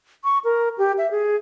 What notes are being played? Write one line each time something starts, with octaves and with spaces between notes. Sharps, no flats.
C#6
A#4
G4
E5
G#4